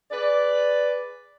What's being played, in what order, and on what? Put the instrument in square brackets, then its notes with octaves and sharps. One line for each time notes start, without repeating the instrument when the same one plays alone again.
[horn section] G#4 B4 D5